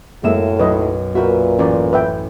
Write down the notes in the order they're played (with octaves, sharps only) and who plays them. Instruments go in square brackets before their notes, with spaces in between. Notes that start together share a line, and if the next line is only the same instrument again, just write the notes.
[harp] F#2 E7 [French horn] A2 [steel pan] G#3 A#3 E5
[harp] B1 [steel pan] B4 D#5
[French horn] A#2 [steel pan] F#4 A#4 [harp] B4 E5
[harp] A1 [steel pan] C#4 D5 A#5
[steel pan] B4 E5 G5